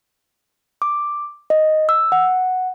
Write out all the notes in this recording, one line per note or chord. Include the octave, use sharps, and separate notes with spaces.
D6
D#5
E6
F#5